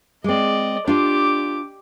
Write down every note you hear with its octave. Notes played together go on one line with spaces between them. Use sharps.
G#3 C4 D5 D#5
D4 F4 G4 D6